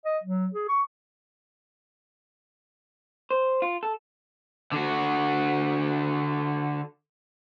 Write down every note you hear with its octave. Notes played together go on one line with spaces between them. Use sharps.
D#5
F#3
G#4
C#6
C5
F4
A4
D3 F#4